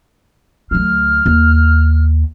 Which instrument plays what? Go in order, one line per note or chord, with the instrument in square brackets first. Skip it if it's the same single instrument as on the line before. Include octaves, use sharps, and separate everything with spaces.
[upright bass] D2 F#3 [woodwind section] F6
[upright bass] D#2